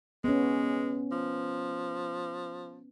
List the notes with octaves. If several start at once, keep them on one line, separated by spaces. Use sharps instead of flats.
G#3 B3 C#4
F3